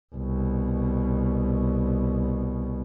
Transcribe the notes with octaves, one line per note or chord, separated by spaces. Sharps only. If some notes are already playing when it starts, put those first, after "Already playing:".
C2 B2